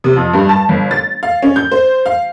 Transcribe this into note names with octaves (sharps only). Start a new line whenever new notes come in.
C3
F2
G2
A5
G1
A6
F5
C#4
G6
C5
F5